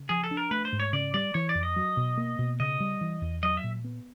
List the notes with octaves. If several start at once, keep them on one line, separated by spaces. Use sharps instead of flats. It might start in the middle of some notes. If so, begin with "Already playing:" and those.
Already playing: C#3
F3 G#4
A4
D4
A#4
A3 B4
C5
G#2
C#5
C#3 D5
G3 D5
E3 C#5
D5
F2
D#5
F#3
B2
A#3
B2
C#3 D#5
G3
E3
E2
F#3 D#5
E5
A#2
B3